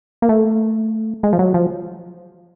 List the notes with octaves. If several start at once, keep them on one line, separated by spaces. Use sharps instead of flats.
A#3
A3
G#3
F3
F#3
F3